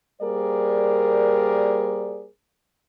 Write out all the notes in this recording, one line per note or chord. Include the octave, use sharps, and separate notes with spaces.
G3 A#3 G#4 A#4 C5 D5